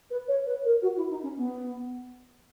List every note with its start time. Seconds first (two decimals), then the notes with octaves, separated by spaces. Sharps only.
0.10 B4
0.28 C#5
0.46 B4
0.65 A#4
0.82 F#4
0.96 E4
1.09 D#4
1.22 C#4
1.37 B3